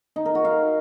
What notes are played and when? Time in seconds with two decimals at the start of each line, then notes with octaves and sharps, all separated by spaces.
0.16 D#4
0.25 A#4
0.35 F#4
0.45 F5